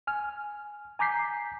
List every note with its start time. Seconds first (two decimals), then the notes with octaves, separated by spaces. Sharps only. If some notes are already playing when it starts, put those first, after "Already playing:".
0.07 G#5 F6
0.99 G#5 A#5 D6 G6 B6 C7